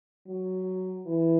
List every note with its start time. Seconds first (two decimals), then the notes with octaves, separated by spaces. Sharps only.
0.27 F#3
1.06 E3